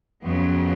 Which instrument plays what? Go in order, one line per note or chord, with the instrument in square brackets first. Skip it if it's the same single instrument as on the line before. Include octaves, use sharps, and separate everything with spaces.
[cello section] F2 C#3 F#3 B3